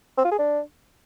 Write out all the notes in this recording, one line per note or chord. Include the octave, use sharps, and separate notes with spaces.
C4
F4
G#4
D4